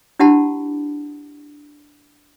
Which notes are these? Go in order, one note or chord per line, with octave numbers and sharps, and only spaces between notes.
D4 E4 G4 F#5 A5 B5